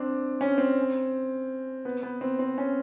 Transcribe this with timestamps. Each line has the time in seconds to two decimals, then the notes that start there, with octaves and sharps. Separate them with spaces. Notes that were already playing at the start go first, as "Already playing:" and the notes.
Already playing: C4 D4
0.41 C#4
0.58 C4
1.85 B3
2.03 B3
2.21 C4
2.39 C4
2.58 C#4